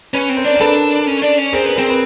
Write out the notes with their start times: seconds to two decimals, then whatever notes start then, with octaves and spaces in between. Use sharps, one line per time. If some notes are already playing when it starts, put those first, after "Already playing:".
0.13 C#4 B4 C#5
0.29 C4
0.37 A#4 C5
0.45 D4
0.55 A#4
0.60 D4 A4 B4
1.07 C#4
1.22 D4
1.38 C#4
1.53 C4 G#4 A#4
1.65 B3
1.76 C4 G#4 A#4
1.90 B4